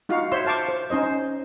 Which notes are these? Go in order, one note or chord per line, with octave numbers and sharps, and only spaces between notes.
D#4 F4 F#4 F5
C5 C#5 E5 C6 E6
C5 F5 A5 C#6 D6
C5
C#4 D#4 C5 D#5